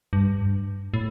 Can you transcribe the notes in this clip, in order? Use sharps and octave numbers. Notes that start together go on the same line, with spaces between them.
G2
A2